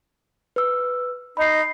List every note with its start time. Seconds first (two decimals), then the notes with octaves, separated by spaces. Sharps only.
0.56 B4 E6
1.37 D#4 B5 C7